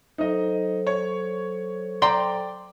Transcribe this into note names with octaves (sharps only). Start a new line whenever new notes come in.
F#3 D#4 A4 C5 D#5
C#5
D5 G5 A#5 C6